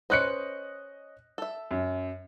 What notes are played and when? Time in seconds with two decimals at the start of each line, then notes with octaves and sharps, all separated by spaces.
0.10 C#4 B4 C5 D#5 F#6 C#7
1.38 A4 E5
1.71 F#2